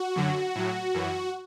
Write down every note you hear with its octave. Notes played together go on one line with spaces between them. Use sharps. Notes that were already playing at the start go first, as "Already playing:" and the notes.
Already playing: F#4
F#2 D3 F#3
A2 F#3
F#2 E3